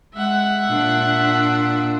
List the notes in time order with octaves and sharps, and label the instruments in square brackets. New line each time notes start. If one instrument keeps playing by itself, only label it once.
[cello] G#3 [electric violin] E5 F#5
[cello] A#2 D4